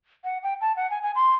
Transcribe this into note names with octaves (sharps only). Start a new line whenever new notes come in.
F#5
G5
A5
F#5
G#5
G#5
C6